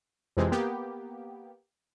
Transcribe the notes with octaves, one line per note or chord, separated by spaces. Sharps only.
F2 C3 E3 G#3 C4
A#3 B3 G4